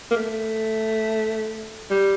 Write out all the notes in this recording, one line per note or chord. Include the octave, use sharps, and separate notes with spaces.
A#3
A3
G3